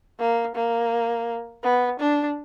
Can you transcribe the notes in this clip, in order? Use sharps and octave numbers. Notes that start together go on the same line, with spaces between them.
A#3
A#3
B3
D4